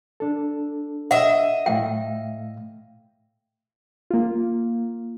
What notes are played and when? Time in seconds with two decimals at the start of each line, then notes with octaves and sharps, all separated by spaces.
0.20 D4 A4
1.11 D#5 E5 F#5
1.66 A2 A3 F5 G5
4.10 A#3 F4